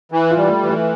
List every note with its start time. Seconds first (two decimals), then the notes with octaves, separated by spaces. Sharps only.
0.12 E3
0.31 F4
0.37 G3
0.49 A3
0.62 E3
0.69 A3